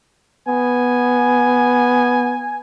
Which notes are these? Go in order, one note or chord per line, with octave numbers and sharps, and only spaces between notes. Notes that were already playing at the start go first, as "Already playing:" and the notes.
B3 G#5